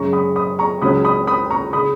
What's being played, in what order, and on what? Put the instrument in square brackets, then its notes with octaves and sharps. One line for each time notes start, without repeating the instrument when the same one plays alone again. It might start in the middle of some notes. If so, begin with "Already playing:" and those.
Already playing: [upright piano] F#2 C#3 G#3 C#4 A#5 C#6
B5 D#6
B5 D#6
A#5 C#6
C#2 C#3 F#3 C#4 B5 D#6
B5 D#6
B5 D#6
A#5 C#6
C#3 B5 D#6